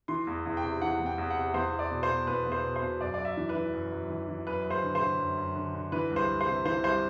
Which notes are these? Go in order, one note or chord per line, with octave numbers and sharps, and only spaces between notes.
E3 C6
E2
E2
G5
C3
E3 F#5
E2
G5
E2
F#5
C3
E2 C5
E2
D5
B2
C5
B2
E2 B4
E2
C5
B2
C5
B2
F#2 D5
F#2 D5
E5
E3
B4
E3
F#2
F#2
E3
E3
F#2 B4
F#2
C5
D3
C5
D3
F#2
F#2
D3
D3
E3 B4
C2
C5
C2
C5
C3
E3 C5
C2 C5